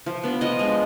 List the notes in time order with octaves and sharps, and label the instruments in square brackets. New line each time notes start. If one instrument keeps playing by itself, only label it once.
[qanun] F3
B3 D4
F3 D#5
G#3 D4